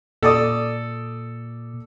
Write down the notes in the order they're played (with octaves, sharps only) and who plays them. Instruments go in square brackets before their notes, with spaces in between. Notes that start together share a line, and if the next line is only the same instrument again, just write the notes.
[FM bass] A#2 [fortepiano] A4 D5 D#6